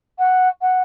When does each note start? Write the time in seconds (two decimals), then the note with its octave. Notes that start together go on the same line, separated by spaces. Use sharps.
0.19 F#5
0.62 F#5